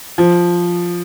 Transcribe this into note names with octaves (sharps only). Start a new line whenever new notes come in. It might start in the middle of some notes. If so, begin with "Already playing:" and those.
F3